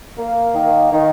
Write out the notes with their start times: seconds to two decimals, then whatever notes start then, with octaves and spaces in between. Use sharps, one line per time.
0.18 A#3
0.54 D#3
0.92 D#3